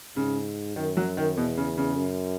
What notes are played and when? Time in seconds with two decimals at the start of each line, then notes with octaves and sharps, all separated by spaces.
0.17 G#2 C#3
0.76 F#2 D#3
0.97 F#3
1.17 D#3
1.37 E2 B2
1.57 C#3
1.77 C#3
1.97 F#2